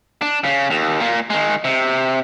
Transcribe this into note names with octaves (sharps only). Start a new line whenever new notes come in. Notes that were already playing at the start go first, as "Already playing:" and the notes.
D4
C#3
D#2
A#2 A#3
D#3 G#3
C3